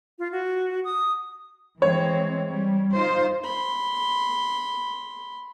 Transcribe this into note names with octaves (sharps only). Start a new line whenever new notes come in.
F4
F#4
D#6
E3 G#3 C4 C#5
G3
D#4 F4 C5
B5 C6